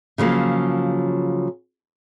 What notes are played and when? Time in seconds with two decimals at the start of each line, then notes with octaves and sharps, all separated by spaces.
0.18 C#3 F3 F#3 A#3